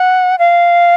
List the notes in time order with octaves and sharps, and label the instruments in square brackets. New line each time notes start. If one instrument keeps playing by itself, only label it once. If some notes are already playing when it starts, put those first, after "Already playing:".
Already playing: [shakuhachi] F#5
F5